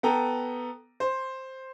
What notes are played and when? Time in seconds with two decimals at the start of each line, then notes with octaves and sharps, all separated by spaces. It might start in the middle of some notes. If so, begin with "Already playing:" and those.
0.03 B3 A4 G5 A#5
1.00 C5